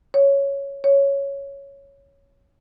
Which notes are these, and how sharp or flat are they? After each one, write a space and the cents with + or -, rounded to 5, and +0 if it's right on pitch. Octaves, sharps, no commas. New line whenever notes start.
C#5 +0
C#5 +0